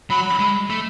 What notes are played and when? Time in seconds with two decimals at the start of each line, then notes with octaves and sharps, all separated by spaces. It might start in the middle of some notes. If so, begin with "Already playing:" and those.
0.10 F#3 B5
0.39 G#3
0.70 A3